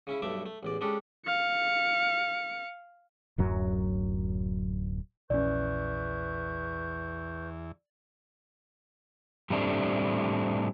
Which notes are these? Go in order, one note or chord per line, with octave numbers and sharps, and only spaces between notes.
C#3 C#4 E4
B1 G2 A3 E5 D6
A3
A1 E2 D5
G#3 C#4 D4 G4 A4
F5 C#7
D1 F#2 F#3
A#1 E2 C#4 B4 D5 C#6 G6
A2 G3 A3 C4 D4